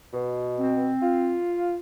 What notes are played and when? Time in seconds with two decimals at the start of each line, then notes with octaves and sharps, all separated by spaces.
0.14 B2
0.58 C4
1.03 F4